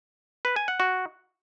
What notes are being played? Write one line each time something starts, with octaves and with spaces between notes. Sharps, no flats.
B4
G#5
F#5
F#4